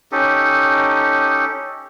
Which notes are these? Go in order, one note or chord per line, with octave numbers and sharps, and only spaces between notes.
C#4 D#4 G4 A4